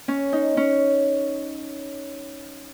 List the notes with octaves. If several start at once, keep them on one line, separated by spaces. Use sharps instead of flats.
C#4
D#4
C#4